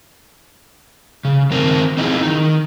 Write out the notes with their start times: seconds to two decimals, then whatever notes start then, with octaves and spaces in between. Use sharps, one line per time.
1.25 C#3
1.51 D#3 C4 A#4 C5
1.97 C4 D#4 E4 G#4
2.23 D#3 D#4